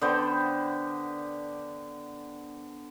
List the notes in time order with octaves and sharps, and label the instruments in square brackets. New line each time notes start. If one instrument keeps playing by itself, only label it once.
[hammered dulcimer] D3 B3 C5 G5